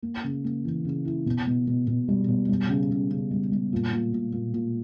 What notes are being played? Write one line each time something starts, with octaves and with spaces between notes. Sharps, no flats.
A#3
C#3
A#3
E3
C#3
E4
B2
B2
B2
B2
G3
B2
G3
C#3
C#3
C#3
G3
G3
A#2
A#2
A#2
A#2
A#2